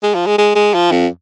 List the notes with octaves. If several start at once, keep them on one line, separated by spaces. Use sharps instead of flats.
G#3
F3
G#3
G#3
G#3
F3
F2